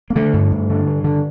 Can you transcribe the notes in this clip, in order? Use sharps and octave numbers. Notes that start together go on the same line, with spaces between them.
A#3
D3 A3
G2
G2
D3
G2
D3